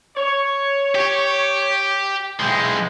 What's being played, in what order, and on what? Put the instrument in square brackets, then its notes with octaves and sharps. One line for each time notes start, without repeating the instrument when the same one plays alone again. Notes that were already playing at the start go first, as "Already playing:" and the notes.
[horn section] C#5
[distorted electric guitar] G4
[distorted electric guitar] B1 G#3 [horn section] E4 G5